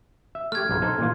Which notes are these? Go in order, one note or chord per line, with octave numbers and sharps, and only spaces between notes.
E5
A3 G4 F6 G#6
B1 G#2
D#4 A4 C5
A#2 E3 F4